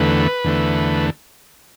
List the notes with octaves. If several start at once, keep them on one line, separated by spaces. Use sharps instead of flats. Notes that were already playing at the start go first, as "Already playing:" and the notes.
Already playing: E2 D3 A3 B4
E2 D3 A3